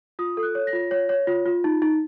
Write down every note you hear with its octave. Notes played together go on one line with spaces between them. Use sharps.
F4 D#6
A4
F#6
C#5
A#6
F4
C#5
C#5
F4
F4
D#4
D#4